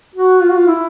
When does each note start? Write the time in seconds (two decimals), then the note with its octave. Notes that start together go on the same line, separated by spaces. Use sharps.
0.15 F#4
0.42 F4
0.49 F#4
0.56 F4
0.67 E4